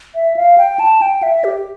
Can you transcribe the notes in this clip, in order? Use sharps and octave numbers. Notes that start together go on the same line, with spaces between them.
E5
F5
G5
A5
G5
E5
G4